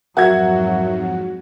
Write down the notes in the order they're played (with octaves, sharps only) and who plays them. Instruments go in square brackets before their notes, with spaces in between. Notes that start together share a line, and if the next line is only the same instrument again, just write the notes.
[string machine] F2 G#2 [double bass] F#3 [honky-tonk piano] F#4 G#6 [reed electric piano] A#4 E5 F#5